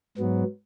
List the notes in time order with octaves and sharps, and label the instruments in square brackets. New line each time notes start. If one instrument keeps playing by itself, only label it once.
[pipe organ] G#2 F#3 B3